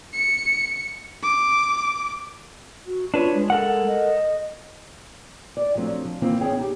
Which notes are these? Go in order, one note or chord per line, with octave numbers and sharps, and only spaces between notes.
C#7
D6
F#4
D4 F4 B4 C#5
G#3
A4 A#4 F#5
D#5
D5
F3 F#3 A3 C4 D4
F3
D#3 E3 A#3 C4 F4
B3 C#4 G#4 C#5 G5
D#4 G4